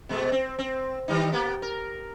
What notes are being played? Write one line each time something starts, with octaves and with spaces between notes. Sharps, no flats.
B2 G#3 A3
C4
C4
D#3 G3 D#4
A#3 B3 G4
A#4